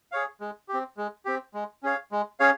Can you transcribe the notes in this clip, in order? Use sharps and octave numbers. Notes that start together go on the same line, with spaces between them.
G#4 C#5 F5
G#3
C4 G4
G#3
C4 G4
G#3
C#4 G#4 C#5 F5
G#3
C#4 G#4 C#5 F5